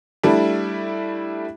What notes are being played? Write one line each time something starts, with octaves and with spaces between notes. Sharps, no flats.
G3 A3 D4 E4